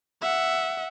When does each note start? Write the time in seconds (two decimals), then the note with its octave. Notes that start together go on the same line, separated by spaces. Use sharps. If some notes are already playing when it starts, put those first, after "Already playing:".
0.22 E5 F#5